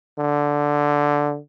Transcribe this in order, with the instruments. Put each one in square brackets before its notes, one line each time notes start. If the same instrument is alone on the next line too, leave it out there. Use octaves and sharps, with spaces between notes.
[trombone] D3